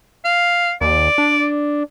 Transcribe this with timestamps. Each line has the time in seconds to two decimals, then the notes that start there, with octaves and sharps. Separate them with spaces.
0.25 F5
0.81 D#2 D5
1.18 D4